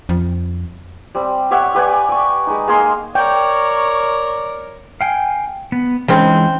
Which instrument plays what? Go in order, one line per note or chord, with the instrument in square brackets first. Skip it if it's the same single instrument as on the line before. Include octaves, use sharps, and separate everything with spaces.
[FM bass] F2
[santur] G3 C4
G4 C#5 E5 F#5
G4 B4 D5 G#5
D5 C#6
G#3 D#4
G#3 A#3 G#4 C6
[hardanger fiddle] A#4 C#5 [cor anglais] D5 [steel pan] G5 [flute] C#6
[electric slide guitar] F5 G5 G#5
B3
[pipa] C#3 C4 [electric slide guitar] E3 G#3 D#4